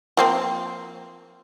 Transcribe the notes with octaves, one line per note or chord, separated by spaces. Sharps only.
F3 A#3 C4